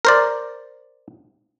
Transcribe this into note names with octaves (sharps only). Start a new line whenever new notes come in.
A#4 C5 D5